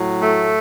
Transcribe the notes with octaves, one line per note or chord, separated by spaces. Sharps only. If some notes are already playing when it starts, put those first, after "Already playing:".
Already playing: A2 F#3
A3